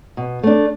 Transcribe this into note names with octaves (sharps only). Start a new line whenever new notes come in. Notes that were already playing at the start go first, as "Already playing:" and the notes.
B2
A3 D4